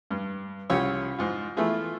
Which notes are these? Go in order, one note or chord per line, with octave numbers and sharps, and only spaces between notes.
G2
C2 C#3 F4 G4 C#5 E6
G#2 F4
E3 A3 B3 F4 G#4